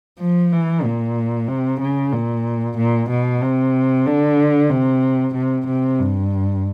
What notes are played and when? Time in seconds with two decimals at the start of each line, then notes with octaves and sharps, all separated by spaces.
0.19 F3
0.52 E3
0.84 A#2
1.48 C3
1.80 C#3
2.13 A#2
2.77 A#2
3.10 B2
3.42 C3
4.06 D3
4.70 C3
5.34 C3
5.67 C3
5.99 G2